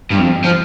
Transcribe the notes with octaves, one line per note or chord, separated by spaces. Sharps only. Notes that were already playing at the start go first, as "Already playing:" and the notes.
G2
F2
F3